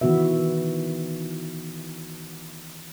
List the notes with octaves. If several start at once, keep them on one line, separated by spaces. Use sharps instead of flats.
D#3 E3 B3 F#4 B4 E5